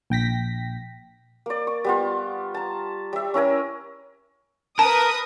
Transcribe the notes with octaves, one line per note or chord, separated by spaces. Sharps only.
A#1 G5 A#6 B6
A#3 D5
C#6
G3 B3 F4
A5 A#5
G3 E5
C#4 E4 A#4 G#5
A#4 B4 A5 D#6